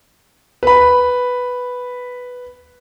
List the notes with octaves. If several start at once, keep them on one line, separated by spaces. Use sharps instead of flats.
B4 B5